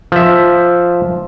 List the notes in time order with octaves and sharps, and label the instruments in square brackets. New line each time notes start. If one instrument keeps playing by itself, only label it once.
[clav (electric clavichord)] F3 E5